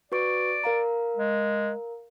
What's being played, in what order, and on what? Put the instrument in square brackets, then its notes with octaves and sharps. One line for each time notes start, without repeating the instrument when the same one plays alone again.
[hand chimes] F#4 B4 C#6 [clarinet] D5
[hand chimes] A#4 F5 A#5
[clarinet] G#3